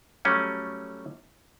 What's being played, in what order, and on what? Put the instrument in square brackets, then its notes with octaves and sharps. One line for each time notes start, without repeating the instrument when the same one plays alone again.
[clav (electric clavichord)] F#3 G3 A3 C#4